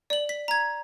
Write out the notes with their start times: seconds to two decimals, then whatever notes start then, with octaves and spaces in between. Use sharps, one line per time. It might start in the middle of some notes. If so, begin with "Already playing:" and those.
0.10 D5 F#7
0.29 B6
0.48 A#5 G#6